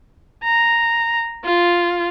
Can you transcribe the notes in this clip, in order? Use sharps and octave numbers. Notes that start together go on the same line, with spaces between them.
A#5
F4